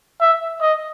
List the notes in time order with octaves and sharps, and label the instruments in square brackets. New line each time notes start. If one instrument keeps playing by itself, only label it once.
[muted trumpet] E5
D#5